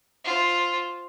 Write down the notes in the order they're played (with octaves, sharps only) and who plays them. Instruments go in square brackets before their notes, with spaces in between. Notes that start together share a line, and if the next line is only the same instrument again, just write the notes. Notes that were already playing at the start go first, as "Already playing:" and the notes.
[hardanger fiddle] F4 C5